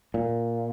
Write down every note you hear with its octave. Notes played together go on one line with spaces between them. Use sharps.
A#2